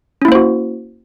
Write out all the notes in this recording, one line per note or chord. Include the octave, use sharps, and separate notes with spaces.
A#3 C#4 E4 F#4 C5